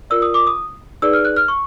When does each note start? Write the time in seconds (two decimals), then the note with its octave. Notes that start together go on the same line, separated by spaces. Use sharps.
0.10 F4 A#4 D5 E6
0.22 D#6
0.34 D6
0.47 D#6
1.02 D#4 G#4 B4 D5 E6
1.13 F6
1.25 F#6
1.36 F6
1.48 C#6